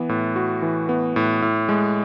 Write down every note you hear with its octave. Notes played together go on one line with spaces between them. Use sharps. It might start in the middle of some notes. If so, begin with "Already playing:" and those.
Already playing: E3 B3
A2
F#4
E3
B3
A2
A2
G#3